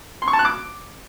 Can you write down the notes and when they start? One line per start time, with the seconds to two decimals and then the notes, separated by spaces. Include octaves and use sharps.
0.22 C6
0.28 C#6
0.33 A5
0.39 F#6
0.45 D6